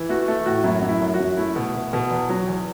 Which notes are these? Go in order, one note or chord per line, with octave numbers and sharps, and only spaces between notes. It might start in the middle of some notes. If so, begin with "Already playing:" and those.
Already playing: E3
A3 F#4
A3 A4
A2 F#4
F#2 E4
F#2 F#4
E4
F#2
F#4
F#2
A3 E4
B2
B2
B2
E2
F#3
E2